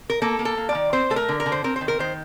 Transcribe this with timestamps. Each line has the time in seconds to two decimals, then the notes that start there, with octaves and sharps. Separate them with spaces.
0.10 A#4
0.22 A#3 A4
0.39 A#3
0.45 A4
0.57 A#3
0.69 D5
0.75 D#3
0.93 C4 C5
1.10 A3 A4
1.16 A#4
1.29 D3
1.40 A#4
1.46 D3
1.52 C5
1.64 C4 A#4
1.76 C5
1.81 D#3
1.88 A#4
1.99 D#3 C5